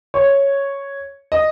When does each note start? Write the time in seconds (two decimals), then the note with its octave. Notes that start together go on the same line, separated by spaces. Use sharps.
0.14 C#5
1.32 D#5